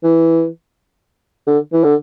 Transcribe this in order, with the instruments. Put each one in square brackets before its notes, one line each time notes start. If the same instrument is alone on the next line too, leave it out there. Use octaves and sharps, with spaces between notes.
[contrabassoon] E3
D3
E3
D3